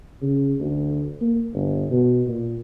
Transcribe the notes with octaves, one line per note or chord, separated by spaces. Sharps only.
C#3
D2
A#3
G1
B2
A#2